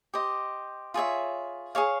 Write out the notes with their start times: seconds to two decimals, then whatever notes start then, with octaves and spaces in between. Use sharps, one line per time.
0.14 G4 C5 D#5
0.94 F4 G#4 C#5 E5
1.75 G#4 C#5 F5